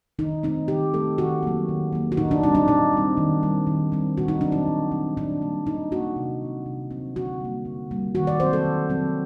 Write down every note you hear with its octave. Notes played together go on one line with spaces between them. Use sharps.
D#3 D#4
A3 C4 D#4
D#3 G4
A3 C4 A4
D#3 F#4
F#3 A#3
D#3
F#3 A#3
F#4
A#2 D#4
D4
G3 C4 D#4
D4
A#2 D#4
G3 C4
D#3
G3 C4
D#3
G3 C4
A#2 F#4
D#4
F#3 C4 D4
D#4
A#2
F#3 C4
A#2 D4
G3 A#3
A#2 D#4
G3 A#3 F#4
C3
F#3 C4
C3
F#3 C4
D3 F#4
G3 A#3
D3
G3 A#3
D#3 F#4
D5
F#3 C4 C5
A4
D#3
F#3 C4